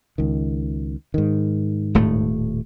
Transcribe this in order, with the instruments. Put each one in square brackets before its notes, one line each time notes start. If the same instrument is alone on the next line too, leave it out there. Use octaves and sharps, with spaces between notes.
[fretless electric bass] C#2 D#3
G#2 D#3
[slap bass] D#1 A2 A3